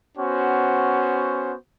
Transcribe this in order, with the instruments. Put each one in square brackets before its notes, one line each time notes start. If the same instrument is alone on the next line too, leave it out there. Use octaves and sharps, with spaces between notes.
[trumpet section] B3 C#4 F#4 C5